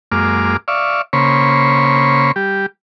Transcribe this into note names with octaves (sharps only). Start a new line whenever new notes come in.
F#2 G#3 A#3 D6 F6
D5 E5 F5 C#6
C#3 A#3 C5 C#5 B5 C#6
G3 G4